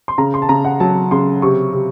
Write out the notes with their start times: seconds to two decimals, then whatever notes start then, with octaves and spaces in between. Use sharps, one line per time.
0.08 C6
0.18 C#3 A#5
0.34 C6
0.42 A5
0.49 C#3 A#5
0.65 F#5
0.80 F#3 A5
1.11 C#3 C6
1.42 C3 C#6
1.73 C3